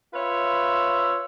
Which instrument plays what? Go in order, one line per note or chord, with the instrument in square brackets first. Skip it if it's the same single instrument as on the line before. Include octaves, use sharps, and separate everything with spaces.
[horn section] F4 B4 C#5 E5